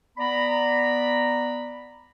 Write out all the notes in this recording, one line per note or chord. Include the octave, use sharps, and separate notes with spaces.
B3 D5 A#5 B5